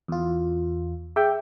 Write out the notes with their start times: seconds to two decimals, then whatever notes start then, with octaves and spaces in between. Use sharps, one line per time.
0.08 E2 F4
1.16 G#4 E5 G5